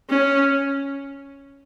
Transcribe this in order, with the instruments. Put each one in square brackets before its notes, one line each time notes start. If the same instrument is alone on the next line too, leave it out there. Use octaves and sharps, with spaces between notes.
[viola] C#4